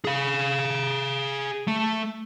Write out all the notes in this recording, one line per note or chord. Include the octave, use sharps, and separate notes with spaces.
G#4 F5
A3